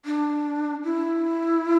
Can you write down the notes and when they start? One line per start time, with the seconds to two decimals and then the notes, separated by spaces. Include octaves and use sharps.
0.05 D4
0.84 E4